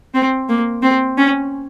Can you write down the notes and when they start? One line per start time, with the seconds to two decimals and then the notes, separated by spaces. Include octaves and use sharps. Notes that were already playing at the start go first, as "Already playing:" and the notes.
0.14 C4
0.49 A#3
0.83 C4
1.18 C#4